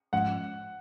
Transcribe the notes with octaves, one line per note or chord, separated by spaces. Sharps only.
G#2 F3 G#3 C#4 F#5